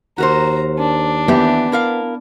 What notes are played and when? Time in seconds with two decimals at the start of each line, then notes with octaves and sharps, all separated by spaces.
0.18 D#2 F#4 A#4 C5 A#5
0.79 D4
1.28 E3 B3 G4 E5
1.72 E4 A#4 F5